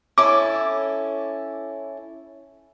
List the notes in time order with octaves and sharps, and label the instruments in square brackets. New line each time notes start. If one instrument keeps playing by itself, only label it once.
[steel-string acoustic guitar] C#4 E4 A4 [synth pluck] D6